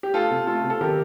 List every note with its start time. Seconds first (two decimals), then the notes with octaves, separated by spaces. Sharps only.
0.03 G4
0.14 A3 F4 A4
0.31 C3
0.47 A3 F4 A4
0.64 C3
0.70 A4
0.81 D#3 G4 A#4